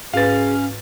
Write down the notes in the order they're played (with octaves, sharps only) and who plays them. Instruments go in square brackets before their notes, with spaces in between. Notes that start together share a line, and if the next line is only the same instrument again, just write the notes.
[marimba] G#2 B4 [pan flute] C#4 [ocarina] G#4 [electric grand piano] F5 A6